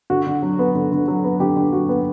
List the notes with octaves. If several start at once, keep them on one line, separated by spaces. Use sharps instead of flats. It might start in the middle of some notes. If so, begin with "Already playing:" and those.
D3 F#4
D3
F#3
B3
D3
D3
F#3
B3
D3 G4
D3
F#3 F#4
B3